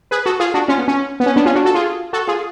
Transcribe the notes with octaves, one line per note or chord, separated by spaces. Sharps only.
G#4 B4
F#4 A4
F4 G#4
D4 F#4
C#4 F4
B3
C#4
B3
C#4
B3 D4
C#4 F4
D4 F#4
F#4 A4
F4 G#4
F#4 A4
F4 G#4